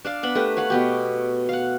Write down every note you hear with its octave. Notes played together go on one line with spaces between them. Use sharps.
D4 D5 F5
B3 D4 B5
A3 G4 A#4 B4
C#5 F5 F#5 B5
B2 B3 G4
F5 F#5